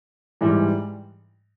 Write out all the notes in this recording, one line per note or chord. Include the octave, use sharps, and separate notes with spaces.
G#2 E3 G3